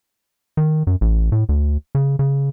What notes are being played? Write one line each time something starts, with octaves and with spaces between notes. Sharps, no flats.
D#3
F#2
A1
A2
D2
C#3
C#3